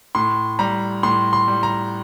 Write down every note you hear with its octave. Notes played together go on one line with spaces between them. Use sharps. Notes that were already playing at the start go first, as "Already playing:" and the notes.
A2 C6
G3 A#5
A2 C6
C6
G3
A#5